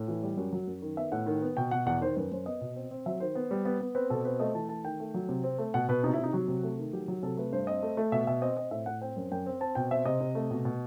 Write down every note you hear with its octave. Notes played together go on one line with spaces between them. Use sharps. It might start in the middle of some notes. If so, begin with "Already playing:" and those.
Already playing: A2
E3
G3
F#2 F#4
F#3
F#2
D#3
B3 E5
A2 F#5
D#3
B3
B2 G5
B2 F#5
E2 F#5
D#3 C5
F#2 B4
F#2 C5
B3 D#5
B2
C4
C4
F#3 E5
D#3 C5
B3
G3
B3
B3
C4 B4
B2 A4
C4 B4
A3 D#5
E3 A5
A3 A5
D#3 G5
A3
F#3
C3
C4
A3
B2 F#5
B2 B4
C3 D#4
E4
C3
D#4
F#3 F#4
C3
A3
D#3
F#3 G4
F#3
C3 A4
A3 B4
G2 C5
C4 D#5
A3
A3
B2 E5
B2 E5
C4 D#5
C4 D#5
A2 E5
A2 F#5
C4 G5
F#2
F#2 G5
C4
C4 A5
B2 G5
C4 E5
C3 D#5
C3
A3
B2
B2